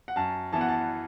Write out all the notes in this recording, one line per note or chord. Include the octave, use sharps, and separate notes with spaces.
F#5
F#2 A5
E3 B3 A5
F#5
A5